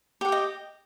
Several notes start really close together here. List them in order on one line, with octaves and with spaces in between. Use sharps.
G4 F#5 G5 D#5